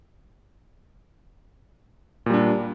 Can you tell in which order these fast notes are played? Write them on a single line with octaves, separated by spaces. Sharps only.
A#2 G3 D4